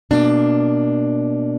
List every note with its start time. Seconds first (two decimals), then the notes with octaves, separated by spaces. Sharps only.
0.11 B2 A#3 D4